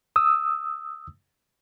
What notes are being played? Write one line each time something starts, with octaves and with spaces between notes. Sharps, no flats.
D#6 E6